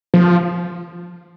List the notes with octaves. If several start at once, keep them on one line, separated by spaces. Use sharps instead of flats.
F3